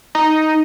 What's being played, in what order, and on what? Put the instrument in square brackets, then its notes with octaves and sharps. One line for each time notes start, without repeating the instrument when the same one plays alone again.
[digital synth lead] D#4